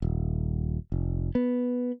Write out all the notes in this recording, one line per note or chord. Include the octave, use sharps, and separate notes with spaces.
D#1
F1
B3